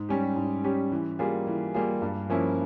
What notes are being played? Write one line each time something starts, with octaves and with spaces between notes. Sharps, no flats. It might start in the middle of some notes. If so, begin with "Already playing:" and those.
Already playing: G#2
G3 C#4 G4
G#2
G3 C#4 G4
E3
G3 A#3 F4 G#4
E3
G3 A#3 F4 G#4
G2
F3 A#3 C#4 E4